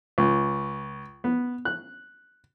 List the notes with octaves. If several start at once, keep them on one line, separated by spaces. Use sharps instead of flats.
C#2
B3
F#6